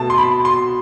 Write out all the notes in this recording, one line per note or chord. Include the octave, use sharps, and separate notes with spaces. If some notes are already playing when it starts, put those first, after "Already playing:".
Already playing: B2 A3 A5
C6
B5
C6